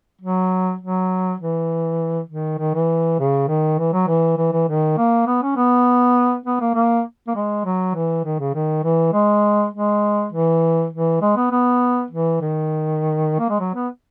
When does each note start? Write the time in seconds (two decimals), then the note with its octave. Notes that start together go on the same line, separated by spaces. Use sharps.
0.22 F#3
0.81 F#3
1.40 E3
2.29 D#3
2.59 D#3
2.74 E3
3.19 C#3
3.48 D#3
3.79 E3
3.93 F#3
4.08 E3
4.37 E3
4.52 E3
4.68 D#3
4.97 A#3
5.27 B3
5.42 C#4
5.57 B3
6.46 B3
6.61 A#3
6.75 A#3
7.28 A#3
7.35 G#3
7.65 F#3
7.95 E3
8.25 D#3
8.39 C#3
8.55 D#3
8.84 E3
9.13 G#3
9.73 G#3
10.33 E3
10.93 E3
11.21 G#3
11.37 B3
11.52 B3
12.11 E3
12.41 D#3
13.39 A#3
13.49 G#3
13.60 F#3
13.75 B3